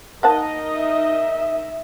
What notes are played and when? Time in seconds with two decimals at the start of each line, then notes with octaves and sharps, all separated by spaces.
0.23 A#3 D#4 A#4 D#5 F#5 A5
0.76 E5